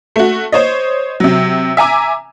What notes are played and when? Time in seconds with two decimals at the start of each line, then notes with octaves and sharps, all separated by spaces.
0.16 A3 F#4
0.52 C5 C#5 D#5
1.20 C3 F#3
1.77 E5 G#5 A#5 D6